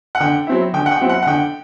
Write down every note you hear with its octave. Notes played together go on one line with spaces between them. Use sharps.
F#5
D3 G5
F#3 C4 E4
D3 G5
F#5
G5
F#3 C4 E4
F#5
F#5
D3 G5